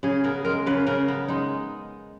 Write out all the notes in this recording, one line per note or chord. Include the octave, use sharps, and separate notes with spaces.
C#3 G#4
B3 A#4
G#3 A#4
C#3 B4
C#3 A#4
B3
G#3 D#4